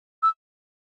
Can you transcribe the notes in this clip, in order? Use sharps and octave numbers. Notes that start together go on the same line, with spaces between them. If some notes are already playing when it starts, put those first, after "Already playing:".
E6